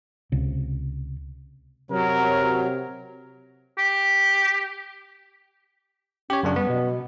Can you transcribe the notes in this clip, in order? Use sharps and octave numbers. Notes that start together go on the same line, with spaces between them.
C#2 C3
C3 F#3 A#4
G4
C#4 G4 C#5
F#2 C#3 D4
G3 B3
B2